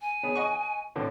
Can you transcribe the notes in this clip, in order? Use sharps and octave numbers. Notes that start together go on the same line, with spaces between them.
G#5
B3 G#4 C#5
D#5 F#5 C#6
A2 D3 C4